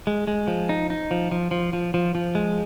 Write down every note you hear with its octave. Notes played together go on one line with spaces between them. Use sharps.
G#3
G#3
F3
D#4
D#4
F3
F3
F3
F3
F3
F3
G#3